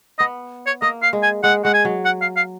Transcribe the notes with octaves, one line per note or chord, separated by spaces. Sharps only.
B3 D#5
C#5
A#3 D#5
F5
G#3
G#5
G#3 F#5
G#3 F#5
G#5
F#3
F#5
F5
F5